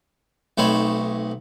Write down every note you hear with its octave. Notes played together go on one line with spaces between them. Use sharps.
B1 A3 C4 D#4 B4 C#5